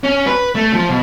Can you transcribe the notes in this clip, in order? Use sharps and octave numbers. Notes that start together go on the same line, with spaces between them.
C#4
B4
A3
F3
B2